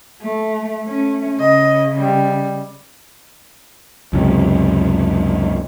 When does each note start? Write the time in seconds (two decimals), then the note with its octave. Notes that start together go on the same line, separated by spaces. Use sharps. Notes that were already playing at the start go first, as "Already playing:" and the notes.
0.22 A3
0.83 A3 C#4
1.40 C#3 D#5
1.96 G3
4.13 C#2 F#2 C3